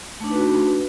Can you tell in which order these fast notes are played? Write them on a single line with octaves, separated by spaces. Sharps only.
A3 D4 D#4 B4 F#4